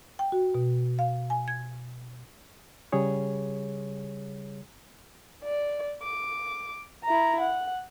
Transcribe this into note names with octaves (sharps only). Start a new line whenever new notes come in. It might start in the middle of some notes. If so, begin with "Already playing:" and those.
G5
F#4
B2
F5
G#5
G#6
C#3 G3 G#4 C#5
D5
D6
E4 A#5
F#5